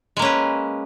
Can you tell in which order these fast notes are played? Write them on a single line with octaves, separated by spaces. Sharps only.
G#3 A#3 C#4 B4